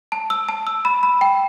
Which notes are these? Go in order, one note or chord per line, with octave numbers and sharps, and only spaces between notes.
A5
E6
A5
E6
B5
B5
G5